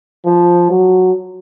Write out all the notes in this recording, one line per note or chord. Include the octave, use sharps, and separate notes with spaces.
F3
F#3